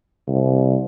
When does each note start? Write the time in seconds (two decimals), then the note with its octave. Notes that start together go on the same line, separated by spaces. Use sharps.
0.27 C2